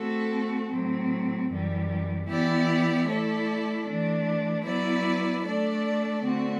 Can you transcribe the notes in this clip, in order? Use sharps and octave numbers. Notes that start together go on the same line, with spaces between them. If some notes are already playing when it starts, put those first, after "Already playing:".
Already playing: A3 C4 F#4 A4
A2 F#3 C4
F#2 E3 G3
E3 B3 E4 G4 D5
A3 E4 A4 D5
E3 A3 D4
F#3 B3 E4 B4 D5
A3 D4 A4 D5
D3 A3 C4 F#4